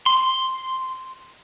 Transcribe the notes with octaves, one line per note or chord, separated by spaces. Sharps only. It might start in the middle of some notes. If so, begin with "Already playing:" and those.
C6